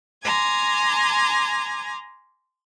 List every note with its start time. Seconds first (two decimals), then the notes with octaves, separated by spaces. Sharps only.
0.24 G#5 A#5 C6 D6 G#6